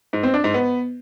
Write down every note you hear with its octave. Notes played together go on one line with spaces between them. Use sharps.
G#2
C4
D4
G#2
B3